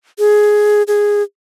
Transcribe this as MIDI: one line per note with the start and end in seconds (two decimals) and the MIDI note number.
0.19 0.83 68
0.88 1.22 68